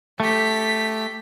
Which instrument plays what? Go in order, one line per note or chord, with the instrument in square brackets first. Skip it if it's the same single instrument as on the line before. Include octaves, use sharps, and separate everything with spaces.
[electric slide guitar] A3 [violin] G4 B6